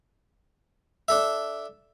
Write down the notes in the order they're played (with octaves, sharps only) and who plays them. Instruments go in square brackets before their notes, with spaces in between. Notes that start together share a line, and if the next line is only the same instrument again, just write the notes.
[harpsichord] D4 A4 E5